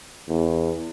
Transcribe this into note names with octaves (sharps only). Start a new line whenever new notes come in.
E2